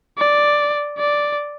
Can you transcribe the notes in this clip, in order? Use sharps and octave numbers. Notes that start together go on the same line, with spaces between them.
D5
D5